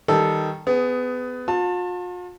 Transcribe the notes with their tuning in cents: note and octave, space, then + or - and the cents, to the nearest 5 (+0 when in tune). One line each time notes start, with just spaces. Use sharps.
D#3 +10 G3 +0 A4 +0
B3 +25 G#4 +0
F4 +45 A5 +20